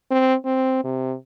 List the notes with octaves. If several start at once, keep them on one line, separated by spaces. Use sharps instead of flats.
C4
C4
C3